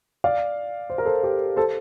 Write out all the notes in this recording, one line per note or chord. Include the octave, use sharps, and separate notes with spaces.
D5 F5
C5
A#4
A4 C5
G4 A#4
A4 C5